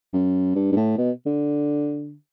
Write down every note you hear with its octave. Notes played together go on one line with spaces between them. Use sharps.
F#2
G2
G2
A2
B2
D3